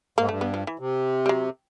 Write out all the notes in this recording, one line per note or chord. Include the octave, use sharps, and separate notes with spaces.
G#2 A#3
G2 A3
B3
F3
E3
C3
G3
F#3